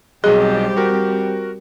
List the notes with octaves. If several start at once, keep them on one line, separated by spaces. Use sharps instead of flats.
B1 F#3 G3 C4 G4 G#4 D#5
F#4 A#4